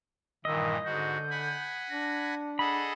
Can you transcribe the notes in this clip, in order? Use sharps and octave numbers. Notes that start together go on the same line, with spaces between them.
G2 A#2 D#3 E3 D#5 E6
G#2 D3 F#4 G6
F#5 G#5 B5
D4 A#6
G#4 A4 D#5 F#5 B5